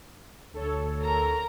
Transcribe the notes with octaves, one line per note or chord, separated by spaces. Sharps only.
D2 A4 C#5
A#4 A#5